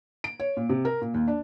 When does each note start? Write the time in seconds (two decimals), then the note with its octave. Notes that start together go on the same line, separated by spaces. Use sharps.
0.24 D7
0.40 C#5
0.57 A#2
0.69 C3
0.85 A#4
1.01 A#2
1.14 D#2
1.28 D4